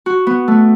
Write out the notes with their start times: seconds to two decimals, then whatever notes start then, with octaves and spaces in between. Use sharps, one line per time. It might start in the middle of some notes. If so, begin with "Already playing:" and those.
0.06 F#4
0.27 B3
0.48 A3